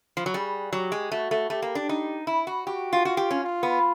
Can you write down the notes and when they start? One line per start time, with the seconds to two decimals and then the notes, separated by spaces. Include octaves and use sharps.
0.17 F3
0.26 F#3
0.34 G3 G#4
0.73 F#3 G4
0.92 G#3
1.12 A3 F#4
1.31 A3
1.50 A3 G4
1.62 A#3
1.75 D4
1.89 D#4
2.27 E4
2.47 F#4
2.66 F#4 G4
2.93 F4
3.05 F4 F#4
3.17 G4
3.31 C#4
3.43 F4
3.63 B3